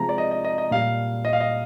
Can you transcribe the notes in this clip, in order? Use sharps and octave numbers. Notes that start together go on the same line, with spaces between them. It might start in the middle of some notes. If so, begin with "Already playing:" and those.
Already playing: C3 F3 G#3 A#5
D5
D#5
D#5
D#5
D#5
A#2 G3 F5
D#5
F5
D#5